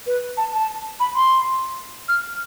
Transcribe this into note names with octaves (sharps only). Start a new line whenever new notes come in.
B4
A5
A5
B5
C6
F6